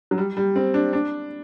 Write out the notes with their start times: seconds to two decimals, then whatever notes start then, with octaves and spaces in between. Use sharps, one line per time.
0.11 F#3
0.18 G3
0.37 G3
0.56 C4
0.74 D4
0.93 D4